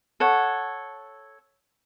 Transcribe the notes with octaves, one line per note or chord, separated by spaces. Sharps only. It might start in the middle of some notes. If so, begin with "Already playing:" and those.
A4 C#5 F#5